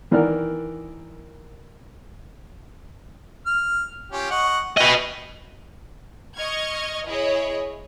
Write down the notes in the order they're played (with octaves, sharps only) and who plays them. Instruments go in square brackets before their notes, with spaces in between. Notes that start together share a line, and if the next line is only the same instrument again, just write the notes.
[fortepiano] D#3 E3 A#4 D5 F#5 F6
[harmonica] F6
C#4 F4 G4
D#5 F#5 C#6
[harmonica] G#4 E5 G5 [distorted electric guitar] B4 D#5
[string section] D#5 C#6 F6 G#6
E4 G#4 C#5 D#5